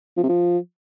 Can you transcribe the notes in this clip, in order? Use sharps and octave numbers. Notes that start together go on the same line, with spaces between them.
F3
C3
F3